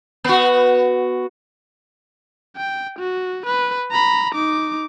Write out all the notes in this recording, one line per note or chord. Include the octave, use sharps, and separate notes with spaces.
B3 F#4
G5
F#4
B4
A#5 B5
D#4 D6